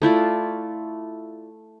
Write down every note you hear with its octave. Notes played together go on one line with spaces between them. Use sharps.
A3 E4 F4 D5